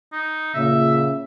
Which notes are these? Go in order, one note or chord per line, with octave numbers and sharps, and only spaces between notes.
D#4
A#2 C#3 E5